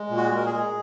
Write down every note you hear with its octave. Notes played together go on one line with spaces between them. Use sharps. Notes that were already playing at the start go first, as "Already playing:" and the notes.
Already playing: G#3
A#2
F#4
G#3
A#4
G#4
G#3